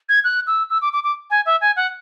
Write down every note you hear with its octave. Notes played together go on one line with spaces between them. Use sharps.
G#6
F#6
E6
E6
D6
D6
D6
G#5
E5
G#5
F#5